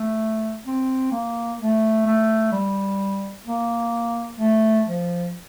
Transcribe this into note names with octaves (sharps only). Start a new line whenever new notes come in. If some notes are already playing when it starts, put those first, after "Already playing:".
Already playing: A3
C4
A#3
A3
A3
G3
A#3
A3
F3